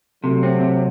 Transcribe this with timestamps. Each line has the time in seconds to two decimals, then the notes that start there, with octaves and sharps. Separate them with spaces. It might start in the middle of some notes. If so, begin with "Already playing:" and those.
0.24 C3 F#3 A3
0.43 C4
0.61 C3